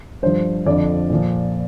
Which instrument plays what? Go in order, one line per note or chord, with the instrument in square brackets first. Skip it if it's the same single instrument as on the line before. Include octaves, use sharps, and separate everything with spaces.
[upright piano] G2 F3 C5
F2 D3 F3 D5
A#2 F3